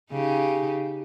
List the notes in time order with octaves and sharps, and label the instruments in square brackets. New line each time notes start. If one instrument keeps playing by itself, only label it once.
[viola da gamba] C#3 D#4 G4